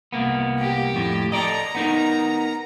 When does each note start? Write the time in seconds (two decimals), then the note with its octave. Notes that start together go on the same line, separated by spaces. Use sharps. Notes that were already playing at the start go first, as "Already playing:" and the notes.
0.13 C2 A#3 B3
0.59 G4
0.94 F2 A2
1.32 A4 D5 D#5 A#5
1.75 B3 D#4 A#4